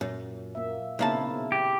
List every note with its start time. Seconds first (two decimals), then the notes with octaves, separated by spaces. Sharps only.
0.01 F#2 A#2
0.55 A#3 E5
0.99 B1 C#3 A#3 C4 E4 A5
1.52 G4